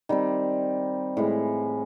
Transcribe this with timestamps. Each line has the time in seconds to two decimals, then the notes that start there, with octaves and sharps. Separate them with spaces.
0.09 D#3 G3 C4
1.17 A2 E3 G#3